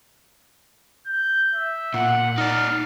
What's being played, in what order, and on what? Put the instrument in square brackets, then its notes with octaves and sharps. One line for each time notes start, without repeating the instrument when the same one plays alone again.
[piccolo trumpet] G6
E5
[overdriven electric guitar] A#2 [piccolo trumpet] F#5
[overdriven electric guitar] D#4 D5 [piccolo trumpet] F6